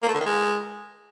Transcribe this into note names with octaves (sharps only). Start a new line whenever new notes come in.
A#3
A3
D3
D#3
G#3